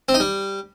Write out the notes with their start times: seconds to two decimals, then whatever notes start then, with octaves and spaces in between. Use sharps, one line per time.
0.09 C4
0.14 D#4
0.20 G3